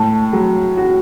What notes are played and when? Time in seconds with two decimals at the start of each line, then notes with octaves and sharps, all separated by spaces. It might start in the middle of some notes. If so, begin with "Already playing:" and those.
Already playing: A2 A5
0.33 F#3
0.77 F#4